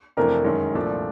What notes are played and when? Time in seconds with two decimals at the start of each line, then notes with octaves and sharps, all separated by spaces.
0.17 F2 C3 E3 A3 D4 A#4
0.44 F#2 D#3 G#3 C#4
0.73 C2 A#2 F3 A3 D4